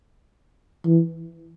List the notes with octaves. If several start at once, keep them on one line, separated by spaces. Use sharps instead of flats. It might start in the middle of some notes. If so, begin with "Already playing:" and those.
E3